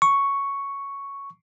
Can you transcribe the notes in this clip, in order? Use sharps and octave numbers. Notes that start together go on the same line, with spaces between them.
C#6